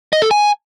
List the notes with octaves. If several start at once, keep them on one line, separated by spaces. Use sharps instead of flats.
D#5
A4
G#5